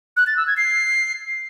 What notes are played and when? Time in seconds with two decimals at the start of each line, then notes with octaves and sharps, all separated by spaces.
0.17 F#6
0.27 A6
0.37 E6
0.47 G#6
0.57 C7